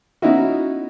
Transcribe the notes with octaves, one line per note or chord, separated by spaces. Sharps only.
B3 C#4 D#4 E4 F#4